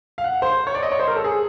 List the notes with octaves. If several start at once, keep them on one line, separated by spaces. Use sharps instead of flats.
F5
F#5
C5
C#5
D5
D#5
C#5
C5
A#4
A4
G#4